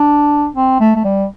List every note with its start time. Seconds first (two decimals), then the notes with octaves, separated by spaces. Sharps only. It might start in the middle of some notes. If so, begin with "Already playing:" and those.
Already playing: D4
0.55 C4
0.80 A3
0.95 A3
1.04 G3